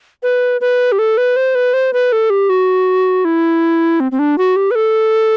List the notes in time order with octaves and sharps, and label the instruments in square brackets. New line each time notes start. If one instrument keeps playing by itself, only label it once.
[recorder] B4
B4
G4
A4
B4
C5
B4
C5
B4
A4
G4
F#4
E4
C4
C4
D4
F#4
G4
B4
A4